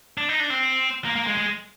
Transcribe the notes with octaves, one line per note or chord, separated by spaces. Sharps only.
D4
D#4
D4
C4
A#3
A#3
G#3
G#3